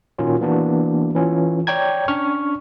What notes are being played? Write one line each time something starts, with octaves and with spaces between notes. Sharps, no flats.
A#2 D#3 C#4 F4 F#4
E3 A#3 B3 D4 F#4
E3 C#4 F4
C#5 D5 G5 A#5 G#6
C#4 D4 C#6 F6